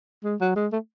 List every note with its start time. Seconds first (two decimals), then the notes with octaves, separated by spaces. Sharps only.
0.24 G#3
0.41 F#3
0.56 G#3
0.73 A3